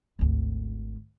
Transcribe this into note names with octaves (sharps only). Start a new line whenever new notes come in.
G#1 D2